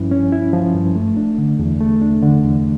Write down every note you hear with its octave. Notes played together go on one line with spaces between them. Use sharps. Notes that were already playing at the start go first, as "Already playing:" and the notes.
Already playing: G2 F3 C#4 E4
C#4
E4
F3
G2
A3
D4
D3
E2
A3
D4
D3
E2